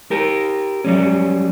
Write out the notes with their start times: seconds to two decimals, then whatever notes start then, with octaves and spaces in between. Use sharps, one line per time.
0.11 G4 A#4
0.84 F#3 G3 C#4